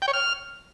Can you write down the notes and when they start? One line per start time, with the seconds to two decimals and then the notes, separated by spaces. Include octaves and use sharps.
0.02 G5
0.08 C#5
0.13 F6